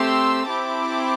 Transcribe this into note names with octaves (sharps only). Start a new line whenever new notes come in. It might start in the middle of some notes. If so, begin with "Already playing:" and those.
Already playing: A3 C4 G4 C6 E6
C4 E4 G4 A5 D6